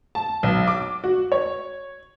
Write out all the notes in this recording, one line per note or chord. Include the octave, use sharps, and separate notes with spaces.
A5
B1
D6
F#4
C#5